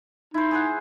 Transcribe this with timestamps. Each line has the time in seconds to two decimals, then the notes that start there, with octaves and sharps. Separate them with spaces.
0.34 D#4 E4 C5
0.51 G#4 C5 F#5